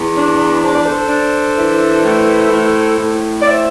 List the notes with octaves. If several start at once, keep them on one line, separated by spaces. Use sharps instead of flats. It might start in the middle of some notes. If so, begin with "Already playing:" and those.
Already playing: E2
D4
D4 C5
D5
A4 C5
D4
E3
A2
A2
A2
D5
C5 E5